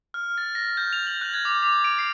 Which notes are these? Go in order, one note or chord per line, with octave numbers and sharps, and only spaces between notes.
F6
A6
A#6
G6
F7
F#7
F#6
G#6
D6
D6
D7
C7